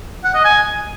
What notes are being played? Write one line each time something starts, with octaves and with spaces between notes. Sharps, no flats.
F#5
D#5
G#5